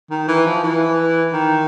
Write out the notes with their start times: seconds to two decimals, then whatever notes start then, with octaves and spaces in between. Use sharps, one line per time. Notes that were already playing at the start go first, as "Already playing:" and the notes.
0.11 D#3
0.28 E3
0.46 F3
0.63 E3
1.33 D#3